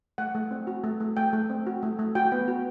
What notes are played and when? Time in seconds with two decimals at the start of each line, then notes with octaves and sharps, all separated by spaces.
0.18 A3 F#5
0.35 A3
0.51 C4
0.67 F#4
0.84 A3
1.00 A3
1.17 A3 G5
1.33 A3
1.50 C4
1.67 F#4
1.83 A3
1.99 A3
2.15 F#4 G5
2.32 B3
2.48 F#4